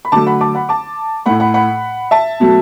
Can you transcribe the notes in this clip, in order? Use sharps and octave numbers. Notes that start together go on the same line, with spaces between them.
B5
D3 F#3 A3 A5 D6
F#5 B5
A5 D6
F#5 B5
A5 D6
A2 A3 F#5 B5
F#5 B5
F#5 B5
E5 A5
B2 F#3 A3